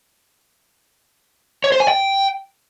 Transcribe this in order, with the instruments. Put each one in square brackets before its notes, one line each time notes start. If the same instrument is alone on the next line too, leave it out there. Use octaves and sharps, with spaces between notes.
[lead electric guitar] C#5
C5
G#5
G5